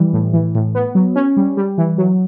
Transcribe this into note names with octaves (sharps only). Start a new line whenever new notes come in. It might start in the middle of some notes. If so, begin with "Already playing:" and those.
Already playing: E3 G3
A2
E3
A2
B3
F#3
C#4
G3
G3
E3
F#3